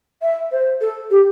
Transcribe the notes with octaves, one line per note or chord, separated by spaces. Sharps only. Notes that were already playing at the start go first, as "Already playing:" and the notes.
E5
C5
A4
G4